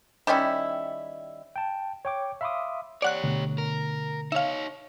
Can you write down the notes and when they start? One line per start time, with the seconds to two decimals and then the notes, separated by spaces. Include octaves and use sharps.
0.27 D#3 G3 C#4 E4
1.56 G5 A5
2.05 C#5 G5 D6
2.41 E5 F5 B5 C6 D6 D#6
3.02 G4 C#5 D5 F#5 F#6
3.24 B2 D3 A3
3.58 A#4
4.32 D#4 C#5 E5 F5